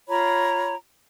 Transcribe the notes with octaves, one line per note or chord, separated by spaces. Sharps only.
F4 C#5 A#5 B5